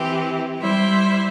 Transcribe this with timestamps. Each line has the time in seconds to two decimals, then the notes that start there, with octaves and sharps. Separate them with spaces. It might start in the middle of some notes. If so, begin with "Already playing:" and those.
Already playing: E3 C4 G4
0.57 G3 E4 C5 E5